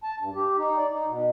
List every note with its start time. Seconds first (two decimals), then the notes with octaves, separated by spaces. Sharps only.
0.04 A5
0.19 G2
0.35 G4
0.57 D#4
0.78 D5
0.92 D#4
1.08 B2